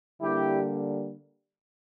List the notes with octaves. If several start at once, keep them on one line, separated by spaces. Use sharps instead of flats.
D3 G3 A#3 E4 G4